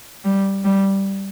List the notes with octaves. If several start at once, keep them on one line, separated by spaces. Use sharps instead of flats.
G3
G3